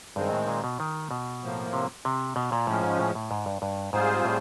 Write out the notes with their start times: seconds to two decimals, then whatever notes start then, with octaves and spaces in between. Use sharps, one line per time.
0.16 G2 D#3 G#3 C4
0.32 A2
0.48 A#2
0.64 B2
0.80 D#3
1.11 B2
1.43 A2 F3 A#3
1.73 C3
2.05 C3
2.36 B2
2.52 A#2
2.67 A2 F3 G#3 C#4
2.83 G#2
2.99 A2
3.15 A2
3.31 G#2
3.46 G2
3.62 G2
3.93 G#2 G3 C4 F4 G#4 C5
4.25 A2